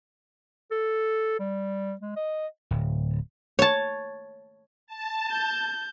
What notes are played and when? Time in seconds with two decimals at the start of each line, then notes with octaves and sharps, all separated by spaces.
0.71 A4
1.39 G3
2.01 G#3
2.16 D#5
2.71 D1
3.59 C#5 A5
4.87 A5
5.31 G6